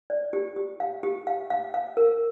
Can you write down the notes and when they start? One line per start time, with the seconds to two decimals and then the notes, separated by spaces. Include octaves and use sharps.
0.10 D5
0.33 G4
0.56 G4
0.80 F5
1.03 G4
1.27 F5
1.50 F5
1.74 F5
1.97 A#4